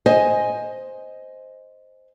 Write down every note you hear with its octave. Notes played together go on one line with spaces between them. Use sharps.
C5 D#5 G#5